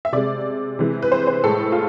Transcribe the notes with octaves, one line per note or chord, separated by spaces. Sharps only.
E5
C3 G#3 D5
C3 E3 G#3
B4
C5
C5
A2 G#3 A4
F4